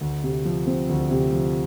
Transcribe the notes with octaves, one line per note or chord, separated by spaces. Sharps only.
D2
C3
F3
C4
D2
C3
F3